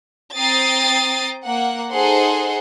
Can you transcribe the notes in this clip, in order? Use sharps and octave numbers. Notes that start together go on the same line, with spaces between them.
C4 G5 A#5 D#6 A6 C7
A#3 F#5
D#4 G#4 A4 C5 F#5 C6